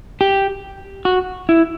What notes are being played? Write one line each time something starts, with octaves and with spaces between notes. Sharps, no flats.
G4
F#4
E4